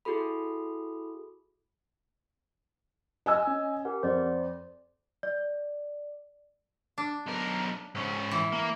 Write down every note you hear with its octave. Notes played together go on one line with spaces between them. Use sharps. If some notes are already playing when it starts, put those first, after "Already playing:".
E4 F#4 G#4 A4 B5
D#5 G#5 E6
C#4
G4 A#4 F#5
F2 C5 D5
D5
D4
B1 A#4
G#2 C#4
E3
A#3